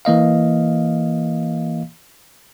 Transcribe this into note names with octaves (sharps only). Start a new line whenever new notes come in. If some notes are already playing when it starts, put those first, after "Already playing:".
E3 A#3 D#5 F5